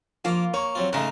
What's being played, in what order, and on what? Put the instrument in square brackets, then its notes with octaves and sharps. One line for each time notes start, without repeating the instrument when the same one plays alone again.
[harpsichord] F3 D6 [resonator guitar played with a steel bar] A#3 F4
[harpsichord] A#3 [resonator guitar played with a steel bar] C#5
[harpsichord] F#3 C4 F4
[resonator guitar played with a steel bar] G#2 C#3 [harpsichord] A3 D#4 A#4